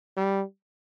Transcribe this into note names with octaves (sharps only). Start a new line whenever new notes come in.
G3